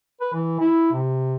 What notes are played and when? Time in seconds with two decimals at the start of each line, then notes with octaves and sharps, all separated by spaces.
0.21 B4
0.34 E3
0.60 E4
0.93 C3